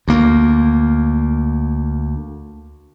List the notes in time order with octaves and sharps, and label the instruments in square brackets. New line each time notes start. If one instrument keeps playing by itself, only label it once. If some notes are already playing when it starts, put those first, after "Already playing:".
[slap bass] D2 A#3